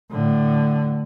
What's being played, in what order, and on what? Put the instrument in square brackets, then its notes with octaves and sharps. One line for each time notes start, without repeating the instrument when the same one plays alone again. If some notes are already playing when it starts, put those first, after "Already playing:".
[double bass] A2 D3